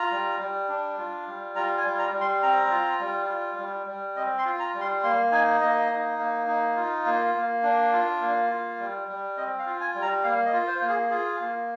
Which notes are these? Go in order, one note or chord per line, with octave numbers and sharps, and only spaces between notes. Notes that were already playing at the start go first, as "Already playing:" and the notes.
Already playing: F4 A#5
G3
G3
D4
F4
G3
F4 A#5
G#5
G3
A#5
G3
C6
C4 A#5
F4
G3
F4
G3
G3
C4 D#5
C6
F4
A#5
G3
C6
A#3 C6
D#4 G#5
A#3 D#5
D#4
A#3
D#4
F4
A#3
A#3
D4
F4
A#3
F4
G3
G3
C4 D#5
F5
F4
G#5
G3
A#5
A#3 F5
D#5
F4
C5
A#3
G#4
F4 G#4
A#3